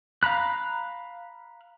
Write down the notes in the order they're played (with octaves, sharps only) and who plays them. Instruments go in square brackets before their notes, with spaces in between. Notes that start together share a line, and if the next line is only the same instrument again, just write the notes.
[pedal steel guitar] F5 A#5 B5 F#6